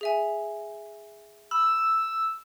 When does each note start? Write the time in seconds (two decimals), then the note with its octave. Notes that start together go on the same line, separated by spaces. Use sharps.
0.01 G#4 E5 G#5
1.51 B5 E6